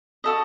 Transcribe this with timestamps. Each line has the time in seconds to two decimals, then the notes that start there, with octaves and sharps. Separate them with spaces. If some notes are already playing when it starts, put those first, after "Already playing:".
0.24 F#4 A4 D#5